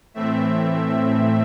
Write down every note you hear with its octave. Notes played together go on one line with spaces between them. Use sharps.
A2 E3 A3 C4 E5